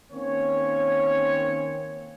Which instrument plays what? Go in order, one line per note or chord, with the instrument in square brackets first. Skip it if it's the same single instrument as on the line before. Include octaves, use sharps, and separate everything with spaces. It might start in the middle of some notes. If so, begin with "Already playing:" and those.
[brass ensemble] D#3 A#3 C4 C#4 C#5